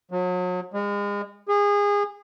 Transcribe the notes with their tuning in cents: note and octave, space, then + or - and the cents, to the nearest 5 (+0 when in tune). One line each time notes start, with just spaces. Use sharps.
F#3 -35
G#3 -35
G#4 -25